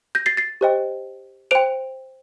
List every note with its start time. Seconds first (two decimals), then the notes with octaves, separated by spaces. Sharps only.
0.15 G6 A#6
0.26 A6 C7
0.37 A6 C7
0.61 G4 C5 D#5 G5
1.51 C5 G5 D7 F7